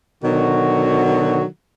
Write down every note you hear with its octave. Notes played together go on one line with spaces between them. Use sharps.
B2 D3 D#3 F#3 F#4